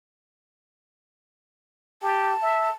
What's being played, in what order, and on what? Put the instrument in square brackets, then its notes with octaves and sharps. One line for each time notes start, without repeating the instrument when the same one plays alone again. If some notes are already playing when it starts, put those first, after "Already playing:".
[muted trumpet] G4 [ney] A5
[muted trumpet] E5